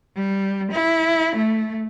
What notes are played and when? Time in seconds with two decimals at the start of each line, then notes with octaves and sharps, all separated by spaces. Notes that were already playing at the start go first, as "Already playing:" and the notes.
0.16 G3
0.72 E4
1.36 A3